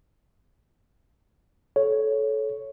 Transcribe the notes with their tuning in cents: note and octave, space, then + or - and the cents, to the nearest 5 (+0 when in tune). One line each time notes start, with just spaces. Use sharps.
A4 -20 C#5 +0